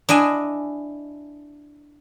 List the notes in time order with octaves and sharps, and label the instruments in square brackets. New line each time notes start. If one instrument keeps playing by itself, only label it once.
[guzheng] D4 E4 D#5 G#5